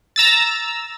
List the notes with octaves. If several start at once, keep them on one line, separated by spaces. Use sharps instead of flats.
A#5 E6 A6